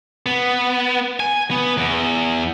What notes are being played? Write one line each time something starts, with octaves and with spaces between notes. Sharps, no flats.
B3
G#5
B3
E2